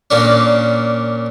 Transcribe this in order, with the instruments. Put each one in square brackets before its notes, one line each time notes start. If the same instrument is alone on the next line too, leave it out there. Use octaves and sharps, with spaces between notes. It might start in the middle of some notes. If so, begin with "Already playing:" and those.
[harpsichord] A#2 A#3 C#4 D4